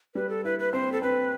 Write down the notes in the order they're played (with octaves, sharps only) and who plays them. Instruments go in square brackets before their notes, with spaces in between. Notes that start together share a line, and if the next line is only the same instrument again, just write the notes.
[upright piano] G3 [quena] B4
[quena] A4
[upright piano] E4 [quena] B4
[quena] B4
[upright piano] C4 [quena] C5
[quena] A4
[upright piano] C4 [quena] B4